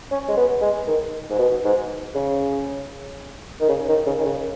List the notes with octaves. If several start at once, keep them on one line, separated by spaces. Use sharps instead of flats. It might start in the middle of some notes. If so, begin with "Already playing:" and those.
C#4
G#3
B3
G#3
D#3
G#2
B2
G#2
C#3
D#3
C#3
D#3
C#3
D#3
C#3